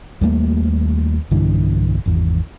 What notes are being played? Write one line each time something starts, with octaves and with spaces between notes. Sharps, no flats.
D#2 G3 A3 A#3
B1 G2 D3 E3
G#1 E2